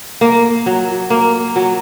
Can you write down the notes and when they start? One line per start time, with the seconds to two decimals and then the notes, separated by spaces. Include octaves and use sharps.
0.21 A#3
0.66 F#3
1.10 A#3
1.56 F#3